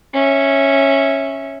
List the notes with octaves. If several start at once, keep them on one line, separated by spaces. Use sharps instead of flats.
C#4 E5